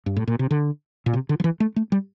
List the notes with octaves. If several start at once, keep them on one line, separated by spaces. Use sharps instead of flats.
G2
A2
A#2
C3
D3
A#2
C3
D3
F3
E3
A3
A3
G3